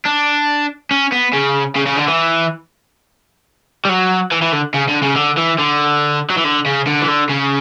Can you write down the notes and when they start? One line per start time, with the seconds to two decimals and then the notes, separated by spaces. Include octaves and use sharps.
0.05 D4
0.91 C#4
1.12 B3
1.33 C#3
1.76 C#3
1.87 C#3
1.97 D3
2.08 E3
3.85 G3
3.89 F#3
4.32 E3
4.42 E3
4.53 D3
4.74 C#3
4.88 D3
5.02 C#3
5.16 D3
5.38 E3
5.59 D3
6.30 F#3
6.37 E3
6.44 D3
6.66 C#3
6.87 D3
7.01 E3
7.08 D3
7.29 C#3